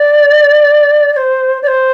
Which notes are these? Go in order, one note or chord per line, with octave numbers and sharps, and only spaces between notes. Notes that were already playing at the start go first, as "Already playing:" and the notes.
Already playing: D5
D5
C5
D5
C5